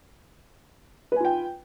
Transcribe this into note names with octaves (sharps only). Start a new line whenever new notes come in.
F4 B4 G5 G#5